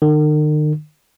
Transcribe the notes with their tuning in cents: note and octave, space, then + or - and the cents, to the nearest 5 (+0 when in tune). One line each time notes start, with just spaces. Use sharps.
D#3 -45